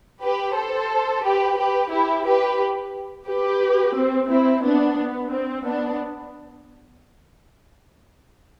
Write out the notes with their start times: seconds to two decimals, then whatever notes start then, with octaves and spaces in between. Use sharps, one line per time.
0.22 G4 B4
0.55 A4 C5
1.23 G4 B4
1.58 G4 B4
1.91 E4 G4
2.26 G4 B4
3.27 G4 B4
3.95 C4
4.29 C4 E4
4.63 B3 D4
4.98 B3
5.30 C4
5.65 B3 D4